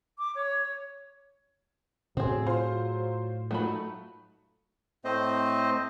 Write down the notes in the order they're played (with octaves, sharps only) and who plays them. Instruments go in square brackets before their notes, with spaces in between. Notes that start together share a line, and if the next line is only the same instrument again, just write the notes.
[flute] D6
C#5
[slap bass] A2 [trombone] F#3 [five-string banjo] C4 G#4
[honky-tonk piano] F4 C5
[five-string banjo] F#3 D#4 B5 [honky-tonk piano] A3 [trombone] F4
[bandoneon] A2 A3 C4 C5 D#5